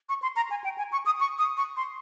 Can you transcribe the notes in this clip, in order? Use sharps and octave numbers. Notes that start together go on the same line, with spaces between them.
C#6
C6
A#5
G#5
G5
G#5
C#6
D#6
C#6
D#6
C#6
C6